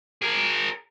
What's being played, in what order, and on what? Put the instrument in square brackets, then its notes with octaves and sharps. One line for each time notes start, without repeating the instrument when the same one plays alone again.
[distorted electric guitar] G#4 A#4